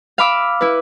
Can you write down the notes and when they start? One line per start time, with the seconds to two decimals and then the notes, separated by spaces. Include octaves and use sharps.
0.18 F5 B5 D6 E6
0.61 E4 B4